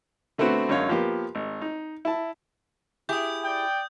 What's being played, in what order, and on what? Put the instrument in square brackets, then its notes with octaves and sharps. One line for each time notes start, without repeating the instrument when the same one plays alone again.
[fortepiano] D3 A3 B3 C4 F#4
G#1 F#2 D3 C#5 F5
F3 A#3 B3 G4
G#1
D#4
E4 A5
[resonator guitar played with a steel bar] E4 G4 G#4 [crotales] D#6 G6
[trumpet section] D5 G5